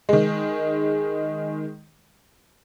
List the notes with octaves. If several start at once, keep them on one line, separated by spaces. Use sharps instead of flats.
D#3 G#3